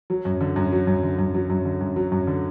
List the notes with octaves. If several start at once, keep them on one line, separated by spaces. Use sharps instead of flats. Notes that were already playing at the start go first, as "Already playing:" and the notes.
F#3
F#2
D3
F#2
F#3
F#2
D3
F#2
F#3
F#2
D3
F#2
F#3
F#2
D3